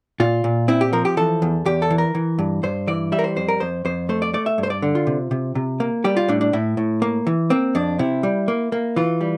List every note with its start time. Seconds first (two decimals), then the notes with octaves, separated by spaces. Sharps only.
0.20 A#2 F4
0.44 A#2
0.68 C4 E4
0.81 G4
0.93 F3 A#4
1.05 G4
1.17 E3 A4
1.42 E2
1.65 E2 G4
1.82 A4
1.90 E3
1.98 A#4
2.15 E3
2.39 G2
2.63 G2 C5
2.87 E3 D5
3.12 G3 E5
3.19 A#4
3.24 C5
3.36 F2 C5
3.48 A#4
3.60 F2 C5
3.85 F2 C5
4.09 A3 C5
4.22 D5
4.34 A3 D5
4.46 E5
4.58 G2
4.63 C5
4.70 D5
4.82 D3
4.95 F4
5.07 C3
5.31 C3
5.55 C3
5.80 A#3
6.04 G3 G4
6.17 F4
6.28 A2 D4
6.41 D4
6.53 A2 E4
6.77 A2
7.02 A#3
7.27 E3
7.50 A#3 C4
7.75 F2 D4
7.99 C3 E4
8.23 G3
8.48 A#3
8.72 A#3
8.96 E3 F4
9.21 G3